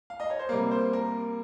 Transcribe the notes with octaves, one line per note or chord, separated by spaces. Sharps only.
F5
D#5
C#5
C5
C3 G3 A#3 A#4
C5
A#4